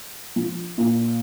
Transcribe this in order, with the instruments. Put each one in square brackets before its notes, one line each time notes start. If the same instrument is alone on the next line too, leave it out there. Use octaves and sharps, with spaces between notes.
[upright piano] F3
A#2